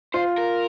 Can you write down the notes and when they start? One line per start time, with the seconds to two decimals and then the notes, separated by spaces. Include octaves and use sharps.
0.14 F4 C5
0.38 A#4